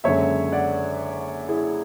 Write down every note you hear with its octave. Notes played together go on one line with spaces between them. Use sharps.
F#1 F#2 D3 G#3 C#5 E5
D5 F#5
E4 G#4